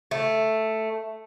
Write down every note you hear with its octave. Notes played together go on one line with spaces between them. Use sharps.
A3